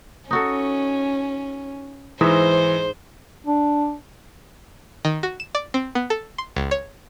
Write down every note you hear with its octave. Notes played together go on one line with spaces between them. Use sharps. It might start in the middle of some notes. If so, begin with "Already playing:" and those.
C#4 D#4 F#4 A4
G#2 E3 D#4 C5 E5
D4
D#3
F#4
E7
D5
C4
B3
A4
C6
C#2
C#5